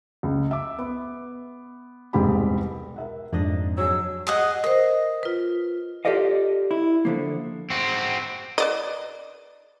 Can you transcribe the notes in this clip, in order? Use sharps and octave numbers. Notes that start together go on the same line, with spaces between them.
C#2
E5 D6
B3
E1 C2 G#2 B3 G4 B5
A#4 E5 F#5
F2 G#2 D3 D4 D#5
F#3 G#4 E6
G#4 D#5 F#5
A#4 C5 D#5
F4 B4
F4 G4 A4 D5 D#5 F5
E4
D3 F3 A#3
C4 F#4
B4 D5 D#5